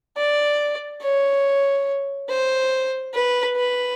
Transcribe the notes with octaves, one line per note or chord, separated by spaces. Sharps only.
D5
C#5
C5
B4
B4